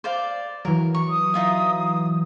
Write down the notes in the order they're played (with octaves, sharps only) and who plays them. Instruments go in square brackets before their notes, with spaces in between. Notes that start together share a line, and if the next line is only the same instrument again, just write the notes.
[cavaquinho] C5 D5 F5
[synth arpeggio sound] E3 F#3 [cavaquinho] A#4
[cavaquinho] C#6
[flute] D#6
[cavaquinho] D#4 F4 E5